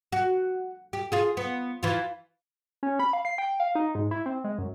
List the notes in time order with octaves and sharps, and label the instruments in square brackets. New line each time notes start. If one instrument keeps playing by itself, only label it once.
[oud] F#4
G4
F4 G#4
B3
E3 F4
[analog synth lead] C#4
B5
F5
C7
G5
F5
D#4
G#2
E4
C4
G#3
F#2